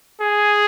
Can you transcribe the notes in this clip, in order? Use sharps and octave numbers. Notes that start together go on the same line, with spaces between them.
G#4